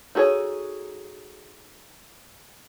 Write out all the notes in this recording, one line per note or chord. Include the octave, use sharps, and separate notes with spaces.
D#4 F#4 G#4 A4 C#5